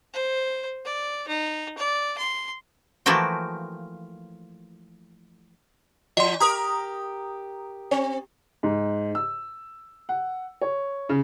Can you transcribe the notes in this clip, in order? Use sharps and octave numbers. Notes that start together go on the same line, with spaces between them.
C5
D5
D#4
D5
C6
E3 F3 A3 A#3 F#4 G5
E3 D#5 C6
G4 A#4 A#5 D#6
C4
G#2
E6
F#5
C#5
C#3